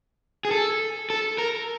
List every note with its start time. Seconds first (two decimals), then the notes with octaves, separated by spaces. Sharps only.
0.45 G#4
0.51 A4
1.10 A4
1.38 A#4